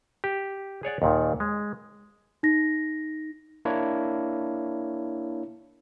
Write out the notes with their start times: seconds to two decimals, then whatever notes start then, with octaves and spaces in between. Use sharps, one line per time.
0.24 G4
0.83 G#4 C#5 D5 F#5
1.02 D#2 A#2 D#3
1.40 G#3
2.43 D#4 A#6
3.65 A#3 D4 E4 C#5